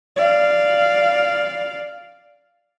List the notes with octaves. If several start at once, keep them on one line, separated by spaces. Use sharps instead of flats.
D5 F5